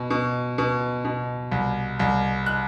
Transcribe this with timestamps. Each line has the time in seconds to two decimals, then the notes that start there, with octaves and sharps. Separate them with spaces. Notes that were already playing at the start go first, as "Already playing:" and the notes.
Already playing: B2
0.10 B2
0.58 B2
1.05 B2
1.52 C2
1.99 C2
2.46 F#6